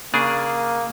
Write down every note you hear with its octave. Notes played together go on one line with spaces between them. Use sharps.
C#3 A#3 D4 G#4